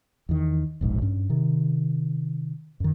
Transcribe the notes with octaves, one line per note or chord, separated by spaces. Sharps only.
E2 D#3
E1 A#1 G#2
G2 C#4
C3 D#3
F#2 D#3